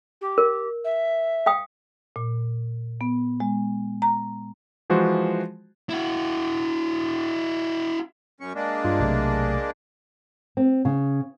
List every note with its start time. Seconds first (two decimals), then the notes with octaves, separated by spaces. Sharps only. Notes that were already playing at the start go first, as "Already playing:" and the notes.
0.21 G4
0.38 A#4
0.84 E5
1.46 F5 G5 D#6
2.16 A#2
3.01 B3
3.40 G#3
4.02 A#5
4.90 E3 F3 G#3 F#4 C5
5.89 E4 F#4
8.40 F#2 C#4 C#6
8.55 G#3 A#3 D4
8.85 G2 F4
9.00 B1 C3 A3
10.57 C4
10.85 C#3